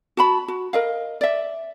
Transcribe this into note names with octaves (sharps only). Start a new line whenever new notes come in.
F#4 A5 B5
F#4
A#4 D#5 F5
D5 E5